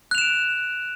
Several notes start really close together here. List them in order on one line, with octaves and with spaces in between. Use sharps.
F#6 F7 E7 D7